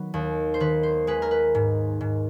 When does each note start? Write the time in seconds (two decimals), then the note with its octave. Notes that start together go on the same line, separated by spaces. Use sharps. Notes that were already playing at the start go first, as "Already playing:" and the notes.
Already playing: D#3 F#3 B3
0.14 D#2
0.54 C5
0.60 D#3 B4
0.83 C5
1.07 G#3 B4
1.22 A#4
1.31 B4
1.55 G#2
2.01 G#2